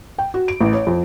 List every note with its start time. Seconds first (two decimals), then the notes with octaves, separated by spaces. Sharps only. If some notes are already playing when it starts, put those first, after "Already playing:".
0.18 G5
0.34 F#4
0.48 D7
0.61 A1
0.73 C#5
0.87 F2